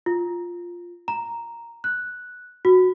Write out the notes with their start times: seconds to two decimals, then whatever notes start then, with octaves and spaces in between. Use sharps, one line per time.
0.06 F4
1.08 A#5
1.84 F#6
2.65 F#4